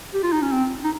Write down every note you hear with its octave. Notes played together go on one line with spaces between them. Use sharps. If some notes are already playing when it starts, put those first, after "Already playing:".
G4
F4
D#4
C#4
C4
D#4